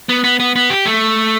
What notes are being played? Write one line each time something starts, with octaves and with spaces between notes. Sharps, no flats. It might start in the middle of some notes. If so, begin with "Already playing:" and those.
B3
B3
B3
B3
G4
A3